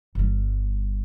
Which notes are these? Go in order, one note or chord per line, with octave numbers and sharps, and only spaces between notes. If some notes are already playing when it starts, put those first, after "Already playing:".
G1 G3